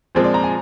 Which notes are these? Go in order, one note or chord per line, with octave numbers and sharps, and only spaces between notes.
A#2 F3 G#3 C4 C5
D5
A#5
G#5